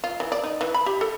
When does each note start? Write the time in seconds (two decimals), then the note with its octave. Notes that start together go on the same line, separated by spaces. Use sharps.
0.04 F4
0.20 E3
0.32 D5
0.43 D#4
0.61 E3
0.74 B5
0.86 G4
1.01 A4